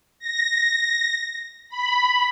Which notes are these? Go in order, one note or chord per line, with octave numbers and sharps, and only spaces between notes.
A#6
B5